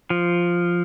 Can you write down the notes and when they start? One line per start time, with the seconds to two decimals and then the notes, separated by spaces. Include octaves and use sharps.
0.10 F3